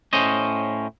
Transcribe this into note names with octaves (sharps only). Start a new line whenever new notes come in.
A2 C#4 C5 D#5